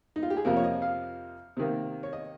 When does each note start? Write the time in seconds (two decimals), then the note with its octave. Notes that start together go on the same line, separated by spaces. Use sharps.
0.16 D#4
0.23 F4
0.30 G4
0.37 G#4
0.45 F2 C3 F3 A#3 A#4
0.57 C#5
0.64 D#5
0.82 F5
1.57 C3 D#3 A#3
2.03 C#5
2.13 D#5